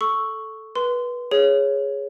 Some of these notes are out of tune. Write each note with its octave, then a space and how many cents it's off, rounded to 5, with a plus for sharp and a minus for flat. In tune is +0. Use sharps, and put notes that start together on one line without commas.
A4 +0 C#6 +0 E6 +0
B4 -20 C6 -20
G#4 +0 C#5 +0